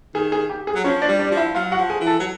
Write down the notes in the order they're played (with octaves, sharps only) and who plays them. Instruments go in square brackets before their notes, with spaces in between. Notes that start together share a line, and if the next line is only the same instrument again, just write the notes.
[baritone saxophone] D#3 [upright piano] G#4
[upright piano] G#4
G4
G#4
[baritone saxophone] F#3
[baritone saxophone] F3 [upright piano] C#4 C#5
[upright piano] D4 D5
[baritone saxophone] G3
[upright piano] D4 D5
[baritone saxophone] F3
[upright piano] E4 E5
[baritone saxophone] F#3 [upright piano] F4 F5
[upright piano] F#4 F#5
[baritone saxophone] F3
[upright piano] G#4 G#5
[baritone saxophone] E3
[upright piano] A4 A5
[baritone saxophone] F#3